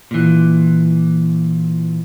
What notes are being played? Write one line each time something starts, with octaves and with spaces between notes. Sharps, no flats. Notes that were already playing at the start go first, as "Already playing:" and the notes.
A#2 E3